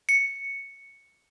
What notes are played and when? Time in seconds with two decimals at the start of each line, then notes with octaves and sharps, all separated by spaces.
0.09 C#7